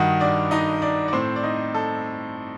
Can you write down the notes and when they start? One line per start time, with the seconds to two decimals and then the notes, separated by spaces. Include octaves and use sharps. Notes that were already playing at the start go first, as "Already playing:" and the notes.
Already playing: G2 D#3 F#4 F#5
0.20 D4 D5
0.51 D#4 D#5
0.82 D4 D5
1.08 D5
1.13 A2 C4 C5
1.36 D5
1.43 D#4 D#5
1.74 A4